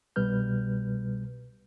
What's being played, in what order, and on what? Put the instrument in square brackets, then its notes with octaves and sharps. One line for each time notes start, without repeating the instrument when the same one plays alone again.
[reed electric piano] C2 B2 G3 B4 F6 G6